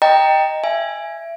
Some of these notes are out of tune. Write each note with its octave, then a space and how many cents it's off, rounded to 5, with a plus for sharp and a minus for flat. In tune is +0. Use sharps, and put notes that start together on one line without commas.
D#5 +0 G5 +0 A#5 +0
E5 +25 G#5 -5